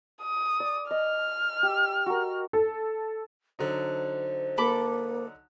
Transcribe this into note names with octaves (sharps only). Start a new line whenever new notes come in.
D#6
D5
D#5 F6
G4
F#4 A#4
A4
D3 F#3 D#4 C5
A#3 A4 B5 D6